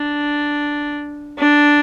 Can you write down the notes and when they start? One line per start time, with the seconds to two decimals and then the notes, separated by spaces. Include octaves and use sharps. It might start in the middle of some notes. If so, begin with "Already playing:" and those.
Already playing: D4
1.39 D4